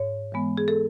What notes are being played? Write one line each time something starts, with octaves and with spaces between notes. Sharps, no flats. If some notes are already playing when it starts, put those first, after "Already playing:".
Already playing: G#2 C#5
E3 G#3 B3
G#4
A4